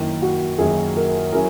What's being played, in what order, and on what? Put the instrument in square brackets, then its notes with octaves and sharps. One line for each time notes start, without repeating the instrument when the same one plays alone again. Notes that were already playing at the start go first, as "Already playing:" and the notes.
Already playing: [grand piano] F#2 D#3 A#3 [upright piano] E4
[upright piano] F#4
[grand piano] F#2 D#3 A#3 [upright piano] G#4
[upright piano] A#4
[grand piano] F#3 C#4 E4 G#4 [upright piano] A#4